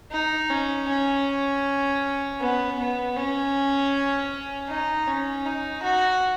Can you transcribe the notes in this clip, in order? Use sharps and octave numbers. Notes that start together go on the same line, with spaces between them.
D#4
C#4
C#4
B3
B3
C#4
D#4
C#4
D#4
F#4